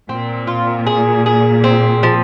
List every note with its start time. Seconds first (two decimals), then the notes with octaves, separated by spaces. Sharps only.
0.09 A#2 C4
0.47 F4
0.87 G#4
1.26 G#4
1.64 C4
2.03 F3